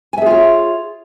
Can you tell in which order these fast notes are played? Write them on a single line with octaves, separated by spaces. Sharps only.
G#5 E5 G#4 F4 C#5